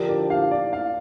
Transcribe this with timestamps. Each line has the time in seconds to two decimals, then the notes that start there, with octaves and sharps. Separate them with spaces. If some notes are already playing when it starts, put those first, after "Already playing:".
Already playing: D3 F3 D4 G4 A#4
0.09 D5
0.30 F5
0.51 D5
0.73 F5